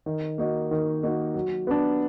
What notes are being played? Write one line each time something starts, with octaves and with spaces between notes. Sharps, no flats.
D#3
A#3 D#4 F#4 A#4
D#3
A#3 D#4 F#4 A#4
F#3
B3 D4